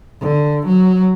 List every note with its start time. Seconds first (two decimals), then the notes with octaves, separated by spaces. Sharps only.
0.21 D3
0.67 F#3